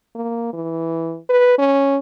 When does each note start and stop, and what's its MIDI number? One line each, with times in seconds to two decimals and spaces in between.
0.15 0.50 58
0.53 1.18 52
1.29 1.58 71
1.58 1.98 61